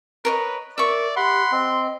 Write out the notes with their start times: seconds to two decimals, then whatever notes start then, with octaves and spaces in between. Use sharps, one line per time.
0.25 A#4 B4 C#5 D#5
0.78 A#4 D5 E5 C#6
1.16 G4 F#5 B5 C6
1.52 C4 D#5